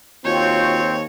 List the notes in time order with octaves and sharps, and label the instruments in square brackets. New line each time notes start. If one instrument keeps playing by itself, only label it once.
[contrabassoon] D#2 [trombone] C4 [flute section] F4 F#4 G6 [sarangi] C#5